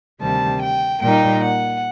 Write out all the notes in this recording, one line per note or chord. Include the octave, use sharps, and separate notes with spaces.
D2 C3 D#3 G3 C4 A5
G5
A#2 G3 A#3 D#4 G5
F#5